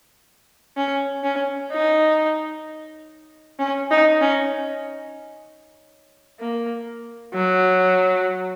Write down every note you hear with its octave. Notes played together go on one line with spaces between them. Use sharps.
C#4
C#4
D#4
C#4
D#4
C#4
A#3
F#3